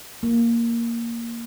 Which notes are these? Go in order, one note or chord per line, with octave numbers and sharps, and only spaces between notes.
A#3